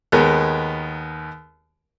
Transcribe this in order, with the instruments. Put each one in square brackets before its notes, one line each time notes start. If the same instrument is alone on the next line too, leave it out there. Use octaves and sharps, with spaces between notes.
[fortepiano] D#2 G#3 B3 A#4